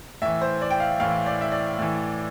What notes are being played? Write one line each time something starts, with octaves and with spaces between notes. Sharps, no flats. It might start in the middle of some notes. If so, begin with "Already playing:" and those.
A2 E3 E5
C5
D5
G5
F5
A2 E3 F5
D5
E5
D5
A2 E3